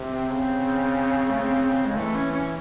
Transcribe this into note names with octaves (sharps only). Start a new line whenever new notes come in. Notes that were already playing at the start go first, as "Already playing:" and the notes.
Already playing: C3
C4
C#3
A3
C4
G#3
E3 A3
C#4
C#4